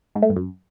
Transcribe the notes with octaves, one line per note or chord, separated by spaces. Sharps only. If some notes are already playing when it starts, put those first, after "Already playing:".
G#2
A3
G2
F#2